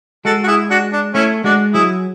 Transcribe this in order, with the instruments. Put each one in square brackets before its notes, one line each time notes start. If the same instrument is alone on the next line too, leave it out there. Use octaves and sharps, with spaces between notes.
[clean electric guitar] G#3 [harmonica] F#4 A4
[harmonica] F#4
E4 G#4
D4 F#4
D4
[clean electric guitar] A3 [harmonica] C#4 E4
[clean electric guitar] G#3 [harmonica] D4 F#4
[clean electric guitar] F#3 [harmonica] E4 G#4